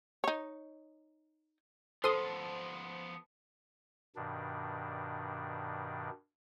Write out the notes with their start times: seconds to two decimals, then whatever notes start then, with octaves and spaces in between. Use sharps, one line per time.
0.24 D#4 C#5
2.04 F3 B3 A4 C5 C6 D#6
4.16 G2 B2 D#3 D4